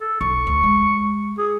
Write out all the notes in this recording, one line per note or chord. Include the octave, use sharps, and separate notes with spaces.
A4
B1 C#6
D2
G#3
G#4